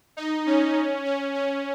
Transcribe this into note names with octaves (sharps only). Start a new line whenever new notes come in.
D#4
C#4
C#4
C#4